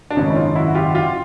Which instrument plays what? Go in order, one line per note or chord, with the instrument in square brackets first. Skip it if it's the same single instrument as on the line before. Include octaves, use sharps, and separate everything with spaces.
[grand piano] D4
[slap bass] G#1 F#2 C#3 [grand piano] C#4 D#4
[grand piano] E4
D#4 F4
E4 F#4
F#4
F4 G4
F#4
F4 G4